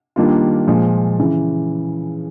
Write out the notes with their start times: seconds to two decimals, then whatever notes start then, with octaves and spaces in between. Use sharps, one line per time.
0.16 D#3 G3 A#3 D4 F4
0.68 A#2 F3 G#3
1.19 C#3 E3